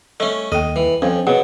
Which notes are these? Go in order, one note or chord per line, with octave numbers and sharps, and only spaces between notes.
A3 C#4 D#5
D#2 A4 D#5 G5
E3
F2 C#4 C5 F5
B2 G#4 C#5 F#5